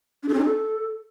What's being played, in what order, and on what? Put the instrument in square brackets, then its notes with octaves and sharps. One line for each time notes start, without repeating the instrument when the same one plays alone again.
[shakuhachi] D4
A4
C#4
D#4
A4